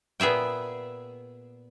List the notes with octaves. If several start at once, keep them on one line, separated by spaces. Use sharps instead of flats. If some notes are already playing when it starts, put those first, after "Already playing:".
A#2 B3 G#4 E5 G5